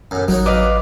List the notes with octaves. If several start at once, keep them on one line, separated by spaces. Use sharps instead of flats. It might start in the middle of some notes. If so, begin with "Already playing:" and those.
F#2 A2
A1 F#3 D#4 F#4 C#5
B4 D#5 F5 D6